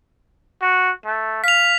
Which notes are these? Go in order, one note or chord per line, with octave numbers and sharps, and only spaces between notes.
F#4
A3
F5 B6 F7